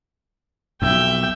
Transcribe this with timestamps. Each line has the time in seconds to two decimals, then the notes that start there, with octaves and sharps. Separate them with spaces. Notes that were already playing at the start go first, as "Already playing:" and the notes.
0.82 B1 F2 E5 G5